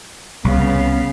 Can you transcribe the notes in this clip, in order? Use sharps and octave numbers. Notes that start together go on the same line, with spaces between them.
C2 C#3 B3 F5